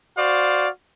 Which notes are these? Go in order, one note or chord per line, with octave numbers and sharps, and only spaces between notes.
F#4 C5 D5 F5